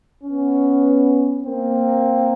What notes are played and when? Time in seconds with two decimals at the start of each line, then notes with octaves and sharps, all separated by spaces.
0.24 B3 C#4
1.45 A#3 C4